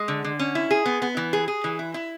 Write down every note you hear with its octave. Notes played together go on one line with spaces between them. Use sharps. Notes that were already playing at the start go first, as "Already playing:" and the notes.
Already playing: G#3
D3
D3
C#4
E4
G#4
B3
B3
E3
G#4
G#4
E3
E4
E4